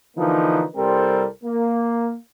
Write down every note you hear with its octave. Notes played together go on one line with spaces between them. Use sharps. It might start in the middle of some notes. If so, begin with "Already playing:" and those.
D3 E3 F3 A#3 D#4
C2 G3 C4 A4 A#4 C5
A#3